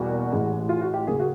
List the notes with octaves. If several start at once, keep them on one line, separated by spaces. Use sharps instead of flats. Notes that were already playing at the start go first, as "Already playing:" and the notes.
Already playing: E2 B2 G3 A#3 F#4
A1 A2 E3 G#3
F4
F#4
G4
D#2 C#3 F#3 A#3 G#4
F#4